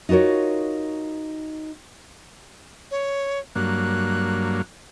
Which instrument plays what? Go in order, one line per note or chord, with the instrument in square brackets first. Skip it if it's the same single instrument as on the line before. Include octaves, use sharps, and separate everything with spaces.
[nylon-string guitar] D#4 F4 F#4 A#4 C#5
[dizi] C#5
[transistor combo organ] G2 F#3 A#3 [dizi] F#6